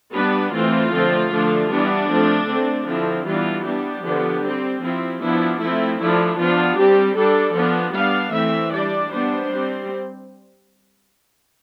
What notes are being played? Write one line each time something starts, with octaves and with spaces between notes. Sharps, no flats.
G3 B3 D4 B4
E3 A3 C4 F4
D3 F3 A3 C4
D3 F3 A3 D4
E3 G3 B3 D4
F3 A3 C4
D3 A3 C4
D3 F3 C4 E4
E3 G3 B3 D4 F4
G3 B3 D4 G4
D3 F3 B3 D4
G3 C4
F3 C4 E4
F3 B3 D4 E4
F3 A3 C4 E4
F3 A3 D4 E4
F3 B3 D4 F4
G3 C4 G4
G3 D4 A4
F3 B3 D4
G3 B3 D4 F5
E3 A3 C4 E5
G3 D4 D5
G3 B3 D4 C5
G3 C4